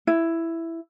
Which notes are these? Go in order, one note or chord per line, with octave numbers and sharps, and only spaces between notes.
E4